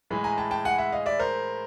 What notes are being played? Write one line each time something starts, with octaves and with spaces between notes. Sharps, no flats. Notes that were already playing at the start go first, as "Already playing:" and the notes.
A2 E3 G#3
G#5 A#5
G5 A5
G5 A5
F#5 G#5
E5 F#5
D#5 F5
D5 E5
A#4 C5